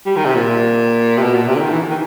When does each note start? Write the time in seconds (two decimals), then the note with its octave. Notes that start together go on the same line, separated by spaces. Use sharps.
0.06 G3
0.16 D#3
0.26 C3
0.35 A#2
1.18 C3
1.22 B2
1.35 A#2
1.48 C3
1.56 D3
1.61 D#3
1.71 E3
1.90 D#3